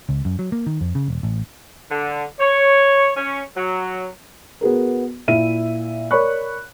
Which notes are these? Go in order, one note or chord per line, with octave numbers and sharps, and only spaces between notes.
C#2
F#2
F#3
A#3
D#3
F2
C#3
E1
A1
D3
C#5
C#4
F#3
B3 F#4 G#4 A#4
A#2 E4 E5 D#7
A#4 C#5 D5 B5 C#6 F#6